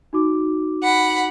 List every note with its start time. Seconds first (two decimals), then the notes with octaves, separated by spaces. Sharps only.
0.13 D#4 F#4 D6
0.83 F#5 B5